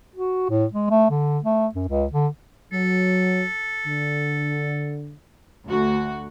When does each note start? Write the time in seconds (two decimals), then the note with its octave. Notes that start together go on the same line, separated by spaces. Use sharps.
0.16 F#4
0.50 A2
0.73 G#3
0.90 A3
1.10 D3
1.44 A3
1.74 F#2
1.88 C#2
2.13 D3
2.73 F#3 A4
3.85 D3
5.66 D2 F#4